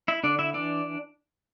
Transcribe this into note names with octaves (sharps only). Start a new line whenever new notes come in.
E4 E5
D3 D4 D5
E4 E5
E3 D4 D5